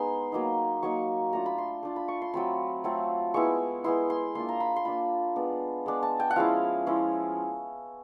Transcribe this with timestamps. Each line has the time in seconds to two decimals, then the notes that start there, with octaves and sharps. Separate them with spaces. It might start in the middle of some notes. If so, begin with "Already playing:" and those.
Already playing: G#3 B3 D#4 C6
0.32 F#3 A#3 D#4
0.83 F#3 A#3 D#4 C#6
1.33 A3 D4 F4 A#5
1.46 B5
1.58 C6
1.83 A3 D4 F4
1.96 B5
2.08 C#6
2.22 C6
2.34 F#3 A3 C4 F4 B5
2.84 F#3 A3 C4 F4
3.34 G#3 B3 E4 C#6
3.84 G#3 B3 E4 C6
4.10 C6
4.35 A#3 D4 F4 C6
4.49 A#5
4.60 B5
4.76 C6
4.85 A#3 D4 F4 B5
5.36 G#3 B3 D4
5.86 G#3 B3 D4
6.03 A5
6.20 G5
6.31 F#5
6.36 F3 G#3 C#4 E4 F5
6.86 F3 G#3 C#4 E4